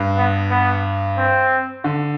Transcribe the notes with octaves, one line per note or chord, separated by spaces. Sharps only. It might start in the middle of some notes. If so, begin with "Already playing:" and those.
Already playing: G2
B3
B3
C4
D3